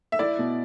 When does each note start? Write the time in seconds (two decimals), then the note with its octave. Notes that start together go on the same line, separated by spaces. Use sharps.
0.12 E5
0.19 E4 D5
0.39 B2